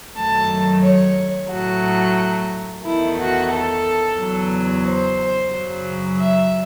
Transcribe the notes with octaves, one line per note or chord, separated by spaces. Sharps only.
F#2 D#3 F#3 A3 A5
C#5
A2 F#3 A3 F#4
E2 D#3 A3 E4
F#4
A4
E2 C#3 F#3
C5
F#2 C#3 F#3
E5